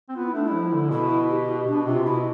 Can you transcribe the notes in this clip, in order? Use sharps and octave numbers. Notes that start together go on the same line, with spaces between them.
C4
B3 F4
E4
A3 D4
E4
F3
D3
B2 E4
G4
B2 D4
C3 F4
B2 E4